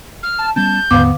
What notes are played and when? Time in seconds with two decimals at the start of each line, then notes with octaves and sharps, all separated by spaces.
0.23 F6
0.38 A5
0.56 G3 B3 C#4 A5 G6
0.91 D#2 G#2 D3 B3 F5 D6